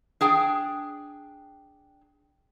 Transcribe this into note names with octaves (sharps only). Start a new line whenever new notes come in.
D4 G#4 G5